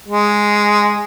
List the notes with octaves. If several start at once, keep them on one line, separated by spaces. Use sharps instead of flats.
G#3